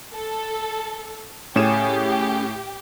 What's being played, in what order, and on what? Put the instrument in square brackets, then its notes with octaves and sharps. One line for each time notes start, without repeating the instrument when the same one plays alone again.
[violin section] A4
[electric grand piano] A2 E7 [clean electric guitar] C#4 G#4 [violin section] G4